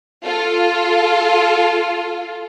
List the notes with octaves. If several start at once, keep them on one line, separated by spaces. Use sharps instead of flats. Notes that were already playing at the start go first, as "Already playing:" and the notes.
F4 A4